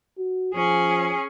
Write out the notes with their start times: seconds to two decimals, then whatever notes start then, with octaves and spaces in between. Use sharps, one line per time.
0.18 F#4
0.55 F3 C#4 G#4